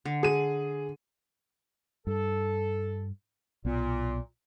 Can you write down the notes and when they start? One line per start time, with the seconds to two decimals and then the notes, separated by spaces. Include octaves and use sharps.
0.05 D3
0.23 G#4 D#7
2.07 G2 A4
3.65 B1 A#2 B3